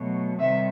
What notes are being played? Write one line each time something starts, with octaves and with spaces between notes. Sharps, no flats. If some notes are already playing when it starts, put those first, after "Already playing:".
Already playing: B2 F#3 A3
C3 D#3 G3 E5